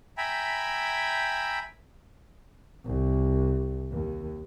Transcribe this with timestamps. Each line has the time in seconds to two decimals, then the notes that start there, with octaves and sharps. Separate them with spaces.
0.18 E5 G5 G#5 A#5 B5
2.86 C2
3.92 D#2